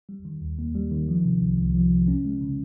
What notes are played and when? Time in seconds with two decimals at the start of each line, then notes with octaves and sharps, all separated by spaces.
0.09 G3
0.25 D#3
0.41 D#2
0.59 A#3
0.75 G3
0.91 D#3
1.08 F3
1.25 C3
1.42 C2
1.58 C2
1.75 F3
1.92 C3
2.08 C#4
2.25 G#3
2.41 C#3